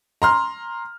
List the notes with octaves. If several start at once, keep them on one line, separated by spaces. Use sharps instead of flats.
A#5 C6 F6